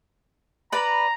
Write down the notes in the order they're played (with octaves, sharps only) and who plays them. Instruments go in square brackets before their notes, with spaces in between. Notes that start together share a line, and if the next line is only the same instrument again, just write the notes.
[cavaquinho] B4 D5 B5 [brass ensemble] A#5